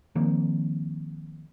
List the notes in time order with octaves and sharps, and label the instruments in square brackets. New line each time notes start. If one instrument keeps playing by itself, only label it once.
[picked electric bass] D#3 F3 A#3 C4